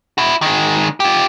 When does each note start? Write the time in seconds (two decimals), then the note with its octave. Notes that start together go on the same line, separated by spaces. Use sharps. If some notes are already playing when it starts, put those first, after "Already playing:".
0.18 E4 F#4
0.42 D#3 G#3
1.00 F4 G4